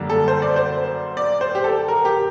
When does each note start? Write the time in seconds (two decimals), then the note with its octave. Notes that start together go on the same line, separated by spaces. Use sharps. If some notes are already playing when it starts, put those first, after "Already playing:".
Already playing: F#2 D3 G3 A#3
0.10 A4
0.28 C5
0.42 D5
0.56 C5
1.17 D5
1.41 C5
1.55 G4
1.64 A4
1.88 A#4
2.05 G4